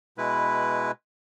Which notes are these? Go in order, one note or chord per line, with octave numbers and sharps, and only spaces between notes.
B2 G#3 E4 B4